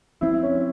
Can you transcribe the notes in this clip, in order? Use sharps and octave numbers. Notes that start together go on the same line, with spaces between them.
F3 C4 E4
C#4